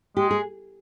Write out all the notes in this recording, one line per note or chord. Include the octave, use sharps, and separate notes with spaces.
G#3 G4
G#4